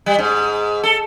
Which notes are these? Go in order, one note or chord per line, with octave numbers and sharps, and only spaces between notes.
G3
G#2
A4